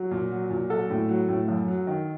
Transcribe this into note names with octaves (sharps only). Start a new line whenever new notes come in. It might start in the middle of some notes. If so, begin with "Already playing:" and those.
Already playing: F#3
A#2
F#3
A#2
F#3 A4
A2
F#3
A2
F#2
F#3
D#3